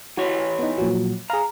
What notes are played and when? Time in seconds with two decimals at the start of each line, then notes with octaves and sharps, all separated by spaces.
0.17 E3 E4 F#4 C#5
0.59 B3 D#4
0.78 A#2 F3 F#3
1.30 G#4 F5 A#5